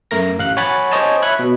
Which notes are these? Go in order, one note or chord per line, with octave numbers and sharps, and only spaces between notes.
F#2 A3 A#4 A#6
A1 F5 F#6
C#5 F#5 G#5 B5 A6
C5 C#5 D#5 G#5 A5
C#5 E5 B5 C#6 F#6 G#6
B2